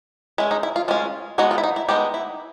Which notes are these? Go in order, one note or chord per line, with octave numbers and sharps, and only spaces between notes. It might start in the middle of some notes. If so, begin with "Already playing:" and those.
G#3 C#4 E4
D#4
E4
F4
G#3 C#4 F4
G#3 B3 D#4 F#4
F4
E4
D#4
E4
G#3 B3 D#4 G4
E4